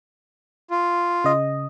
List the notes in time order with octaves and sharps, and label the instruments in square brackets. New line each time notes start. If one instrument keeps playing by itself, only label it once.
[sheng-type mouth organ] F4
[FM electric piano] C#3 D#5